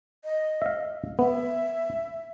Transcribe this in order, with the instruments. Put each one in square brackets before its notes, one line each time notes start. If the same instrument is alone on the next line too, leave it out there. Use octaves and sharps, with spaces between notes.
[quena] D#5
[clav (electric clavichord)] E5 F5
[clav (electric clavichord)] B3 [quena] E5